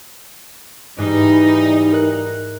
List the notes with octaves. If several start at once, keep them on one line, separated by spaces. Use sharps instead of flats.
G#2 E3 G3 D#4
A#4 F#6